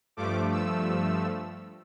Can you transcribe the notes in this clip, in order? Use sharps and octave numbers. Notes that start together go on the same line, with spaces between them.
G2 F3 A3 D6
E6